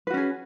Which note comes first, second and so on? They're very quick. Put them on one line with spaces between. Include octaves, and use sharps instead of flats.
B4 F#4 C#4 G#4